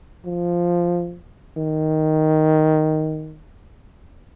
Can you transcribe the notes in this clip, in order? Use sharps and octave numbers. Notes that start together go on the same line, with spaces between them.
F3
D#3